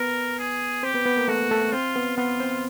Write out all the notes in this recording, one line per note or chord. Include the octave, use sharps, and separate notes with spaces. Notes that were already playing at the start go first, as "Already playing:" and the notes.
Already playing: B3 A#4 B4
G#4
C4 G4 C5
B3 B4
B3 B4
A#3 A#4
A3 F#4 A4
A3 A4
C4 F4 C5
B3 B4
B3 F4 B4
C4 C5